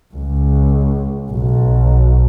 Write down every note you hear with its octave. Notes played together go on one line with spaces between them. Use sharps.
C#2
B1